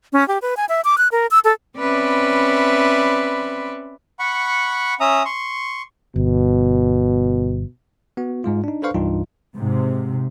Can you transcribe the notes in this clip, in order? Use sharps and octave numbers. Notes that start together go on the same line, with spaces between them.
C#4
G4
B4
G#5
E5
D6
F#6
A#4
E6
A4
C4 C#4 B4 D5 E5 B5
F#5 B5 C#6
C#4 E5 A#5 D#6
C6 C#6
G1 B2
B3 F#4
G#2 G#3 F4
D4 D#4
D4 A4 B4 C5 F5 C#6
C2 G2 E3 D#4 F4
G#2 C3